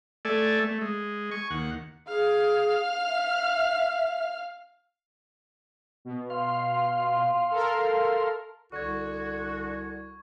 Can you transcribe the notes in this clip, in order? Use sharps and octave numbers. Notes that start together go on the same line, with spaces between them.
A3 A4 D5 G#5
A3
G#3
G#5 C#6
D#2 F#5
G#4 F5 F6
E5
B2
F5 C6
A4 A#4
C2 D3 F#4 C#6 G#6